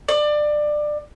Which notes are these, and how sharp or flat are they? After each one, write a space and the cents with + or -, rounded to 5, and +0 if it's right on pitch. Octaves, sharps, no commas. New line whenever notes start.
D5 +20